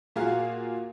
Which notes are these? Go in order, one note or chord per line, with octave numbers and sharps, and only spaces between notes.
A#2 A#3 F#4 G#4 F5